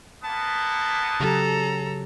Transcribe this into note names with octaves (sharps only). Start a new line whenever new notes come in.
A#3 B3 A5
C#3 F#3 G4 A4 A#5